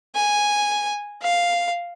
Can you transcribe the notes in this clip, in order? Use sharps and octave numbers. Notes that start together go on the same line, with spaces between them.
G#5
F5